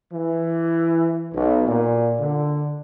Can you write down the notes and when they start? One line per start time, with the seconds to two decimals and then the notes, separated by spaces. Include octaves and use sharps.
0.12 E3
1.34 B1
1.67 A#2
2.20 D3